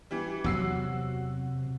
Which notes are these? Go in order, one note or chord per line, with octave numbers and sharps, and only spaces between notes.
E3 G3
E2 C3 F#3 F#4 E6 C7